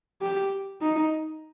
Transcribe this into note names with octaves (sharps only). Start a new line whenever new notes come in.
G4
D#4